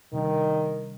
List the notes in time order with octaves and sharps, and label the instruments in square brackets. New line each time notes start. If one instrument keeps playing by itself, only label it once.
[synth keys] C3 G3 D4 [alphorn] D#3